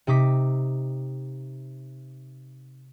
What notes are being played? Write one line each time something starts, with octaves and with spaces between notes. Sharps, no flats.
C3 D#4 D6 B6